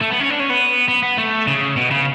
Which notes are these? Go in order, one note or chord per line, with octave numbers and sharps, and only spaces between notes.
A3
B3
C#4
D4
C#4
B3
B3
B3
A3
C#3
B2
C#3